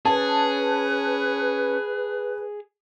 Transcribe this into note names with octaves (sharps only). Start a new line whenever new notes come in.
C#4 G#4 B4 A5